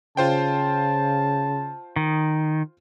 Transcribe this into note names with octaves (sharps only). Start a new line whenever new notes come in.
C#3 F4 C5 G5 A5
D#3